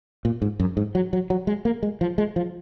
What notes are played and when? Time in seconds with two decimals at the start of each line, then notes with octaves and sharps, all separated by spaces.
0.25 A#2
0.42 G#2
0.60 F#2
0.77 G#2
0.95 F#3
1.13 F#3
1.30 F#3
1.47 G#3
1.65 A#3
1.83 G#3
2.01 F3
2.18 G#3
2.36 F3